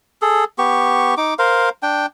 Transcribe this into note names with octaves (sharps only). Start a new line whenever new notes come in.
G#4 A4
B3 G4 C#6
D#4 D6
A#4 C5 F5
D4 G5